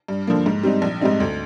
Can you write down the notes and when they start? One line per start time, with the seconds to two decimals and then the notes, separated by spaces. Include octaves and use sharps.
0.08 G2
0.27 D3 F3 A#3
0.46 G#2
0.63 G3 C4 D#4
0.82 A#1
1.01 G#2 G3 C4 D#4
1.20 D2